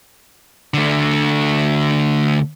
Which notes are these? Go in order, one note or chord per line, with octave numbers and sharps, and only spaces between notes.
D3 A3